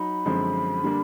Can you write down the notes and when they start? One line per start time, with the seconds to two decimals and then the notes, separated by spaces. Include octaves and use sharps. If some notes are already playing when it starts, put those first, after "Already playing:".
Already playing: F#3 D#4 B5
0.25 F#2 D3 F3 G#3 C4
0.84 D3 G3 A#3 D4